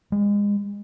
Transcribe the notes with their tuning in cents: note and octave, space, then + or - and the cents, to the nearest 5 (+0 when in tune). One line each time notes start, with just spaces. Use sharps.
G#3 -30